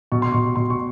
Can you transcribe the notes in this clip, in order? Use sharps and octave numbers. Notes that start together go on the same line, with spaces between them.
B2 C#6
C6
B2 C#6
B2 C6
C#6